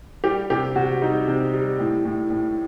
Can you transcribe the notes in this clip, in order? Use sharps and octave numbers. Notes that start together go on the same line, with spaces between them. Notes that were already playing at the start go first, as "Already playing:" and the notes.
G3 G4
C3 G4
C3 F#4
G3 D#4
C3
G3
A2
A2
A2